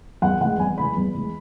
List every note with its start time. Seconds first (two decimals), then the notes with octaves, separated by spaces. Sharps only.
0.22 E2 F#5
0.40 E3 G#3 F#5
0.59 E2 G#5
0.77 E3 G#3 B5
0.96 E2
1.14 E3 G#3